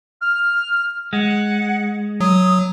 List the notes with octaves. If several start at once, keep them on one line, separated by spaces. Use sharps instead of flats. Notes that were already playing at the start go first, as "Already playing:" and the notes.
F6
G#3 F#5
F#3 D#6